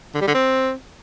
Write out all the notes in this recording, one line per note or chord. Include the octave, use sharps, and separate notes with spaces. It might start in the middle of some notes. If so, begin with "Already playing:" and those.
D3
G3
D3
C4